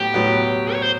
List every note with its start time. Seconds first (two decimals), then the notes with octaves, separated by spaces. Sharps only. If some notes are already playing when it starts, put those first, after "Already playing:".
Already playing: A2 F#3 B3 G4
0.14 A2 F#3 B3
0.73 C#5
0.82 C5